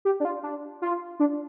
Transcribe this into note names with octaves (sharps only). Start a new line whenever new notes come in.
G4
D4
F4
D4
F4
D4